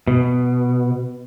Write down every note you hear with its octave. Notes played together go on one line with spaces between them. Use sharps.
B2